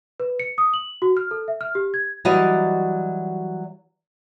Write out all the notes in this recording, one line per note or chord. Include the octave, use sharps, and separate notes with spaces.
B4
C#7
D#6
F#7
F#4
F6
A4
E5
F6
G4
G#6
E3 F#3 G3 F#4 D5 D#5